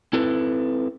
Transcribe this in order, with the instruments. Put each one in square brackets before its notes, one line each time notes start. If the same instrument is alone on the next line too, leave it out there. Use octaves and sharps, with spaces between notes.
[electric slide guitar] C4 E4 A4 B4